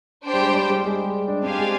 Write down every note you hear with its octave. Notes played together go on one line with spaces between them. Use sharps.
D4 G4 C5 G5
G3
G#3
G3
G3
G#3
D4
C4 D4 G4 C5 F5 G#5
G#3